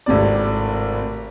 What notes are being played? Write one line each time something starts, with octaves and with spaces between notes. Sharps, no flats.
G#1 A2 C3 D5